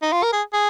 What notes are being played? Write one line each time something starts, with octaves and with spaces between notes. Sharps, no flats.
D#4
F4
A#4
G#4
G#4